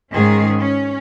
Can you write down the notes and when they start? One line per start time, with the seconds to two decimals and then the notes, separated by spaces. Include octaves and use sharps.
0.12 G#2 D#3 G#3 C#4 G#4
0.60 C#4